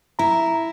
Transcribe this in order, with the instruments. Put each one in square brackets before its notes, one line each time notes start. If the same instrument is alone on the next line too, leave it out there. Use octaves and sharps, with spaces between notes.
[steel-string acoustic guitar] E4 [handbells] A#5